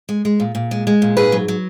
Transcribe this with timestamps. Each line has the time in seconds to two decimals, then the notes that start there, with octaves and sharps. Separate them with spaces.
0.09 G#3
0.25 G#3
0.40 A#2
0.55 A#2
0.71 G#3
0.87 G#3
1.02 A#2
1.17 G#2 G#4 B4
1.32 F#3
1.48 F#3